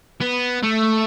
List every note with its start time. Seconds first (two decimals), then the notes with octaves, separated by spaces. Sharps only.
0.21 B3
0.63 A3